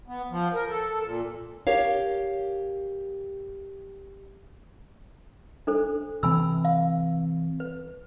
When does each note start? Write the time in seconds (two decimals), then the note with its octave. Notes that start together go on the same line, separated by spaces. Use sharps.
0.08 B3
0.31 F3
0.54 A#4
0.70 A4
1.05 A#2
1.67 G4 A#4 C#5 F5
5.67 D4 A4 C5
6.23 C3 E3 C4 G#5 B5 E6
6.65 F5
7.60 B4